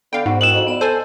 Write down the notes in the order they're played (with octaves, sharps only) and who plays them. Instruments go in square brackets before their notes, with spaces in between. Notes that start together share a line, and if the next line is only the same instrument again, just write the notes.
[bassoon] D3 [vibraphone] B3 [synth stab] F5 G5
[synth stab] G#2 [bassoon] F#4
[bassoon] D#3 [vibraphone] E4 F#4 G5 [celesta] E7 F#7
[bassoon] F2 [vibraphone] D#5
[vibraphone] B3 D5 B5
[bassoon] A4 [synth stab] C5 G#5 [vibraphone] D#5